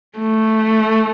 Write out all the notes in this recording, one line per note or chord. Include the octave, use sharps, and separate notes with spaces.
A3